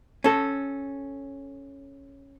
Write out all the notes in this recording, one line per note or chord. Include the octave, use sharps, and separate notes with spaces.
C#4 A4